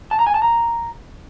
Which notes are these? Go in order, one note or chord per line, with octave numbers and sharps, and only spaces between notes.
A5
A#5
G#5
A5
A#5